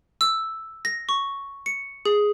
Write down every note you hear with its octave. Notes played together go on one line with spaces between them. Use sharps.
E6
A#6
C#6
C#7
G#4